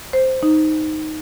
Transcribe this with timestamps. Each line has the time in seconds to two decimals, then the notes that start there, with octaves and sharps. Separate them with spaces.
0.13 C5
0.43 D#4